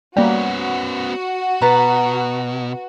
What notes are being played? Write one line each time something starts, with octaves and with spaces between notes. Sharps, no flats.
G3 A#3 B3 C#4 F#4
B2 B4 A#5 A6